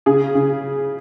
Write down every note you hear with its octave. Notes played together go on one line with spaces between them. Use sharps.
C#3 G#4
C#3